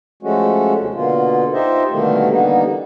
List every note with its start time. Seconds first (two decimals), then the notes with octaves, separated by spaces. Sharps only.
0.23 F3 G#3 A3 C#4 F#4
0.79 D#2 C3
0.94 B2 D3 A#3 F4
1.53 D#4 F4 G4 C5 D#5 E5
1.91 B2 D3 D#3 G3 A3 A#3
2.30 D3 E3 G3 A#3 B3 D#4